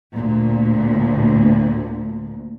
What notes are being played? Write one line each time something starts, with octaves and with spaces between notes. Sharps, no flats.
D2 A#2